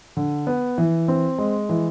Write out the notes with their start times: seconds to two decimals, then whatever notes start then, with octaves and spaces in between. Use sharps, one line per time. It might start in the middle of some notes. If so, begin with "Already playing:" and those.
0.17 D3
0.47 B3
0.78 E3
1.08 C4
1.38 G#3
1.69 E3